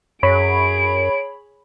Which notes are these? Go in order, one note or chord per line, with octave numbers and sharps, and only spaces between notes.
F#2 G#4 C#5 B5 D7